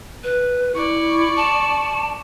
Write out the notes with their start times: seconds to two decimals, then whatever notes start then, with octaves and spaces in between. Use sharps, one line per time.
0.24 B4
0.75 E4 D5 C#6
1.37 A5